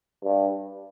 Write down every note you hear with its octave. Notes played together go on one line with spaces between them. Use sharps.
G2